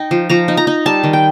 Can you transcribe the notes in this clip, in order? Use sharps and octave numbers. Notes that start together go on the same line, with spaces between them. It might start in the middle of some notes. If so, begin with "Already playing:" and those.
Already playing: D#4 G5
F3
F3 A#5
D#4
A#5
D#4
G3 A5
D#3
G5